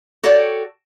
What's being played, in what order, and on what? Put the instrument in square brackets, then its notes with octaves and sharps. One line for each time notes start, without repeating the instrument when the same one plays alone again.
[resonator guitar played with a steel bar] F#4 A4 C#5 D5 G5